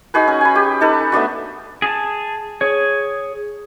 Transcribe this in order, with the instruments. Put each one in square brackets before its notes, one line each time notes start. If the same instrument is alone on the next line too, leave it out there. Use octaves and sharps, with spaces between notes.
[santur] D#4 F#4 G#4 B4
C#4
G#5 B5
G4
D#4 A4 B4
A3 B3 D4 F#4
[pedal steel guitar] G#4 G#5 A5
G#4 C#5